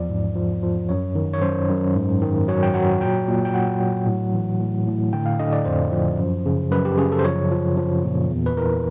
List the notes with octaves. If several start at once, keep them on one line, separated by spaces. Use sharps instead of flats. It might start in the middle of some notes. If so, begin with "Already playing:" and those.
Already playing: E2 F3 D5
G#2
F3
F3
F#2 C#5
D#3
C#5
F#2 C5
F#2
G#2
D#3
F#3 C#5
G5
F#3 F#5
A#2 G5
A#2
G5
F#3 F#5
F#3
A2
E3
A2
A2
D3 G5
F5
D3 D#5
D5
F2 C5
F3
F#2
C#3
F#2 B4
G4
C#3 G#4
A4
C5
F3 C#5
F3
F3
A#2
E2
B4
E3 A#4